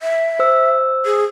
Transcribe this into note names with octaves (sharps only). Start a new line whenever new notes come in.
E5
C5 E6
G#4